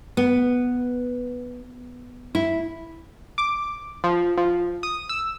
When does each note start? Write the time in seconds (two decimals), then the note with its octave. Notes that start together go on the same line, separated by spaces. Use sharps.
0.17 B3
2.35 E4
3.38 D6
4.04 F3
4.37 F3
4.83 D#6
5.09 E6